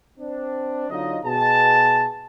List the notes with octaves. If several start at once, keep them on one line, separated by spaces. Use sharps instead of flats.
C4 D4
D3 F#3 D#4 F4 D#5
B2 G#4 A5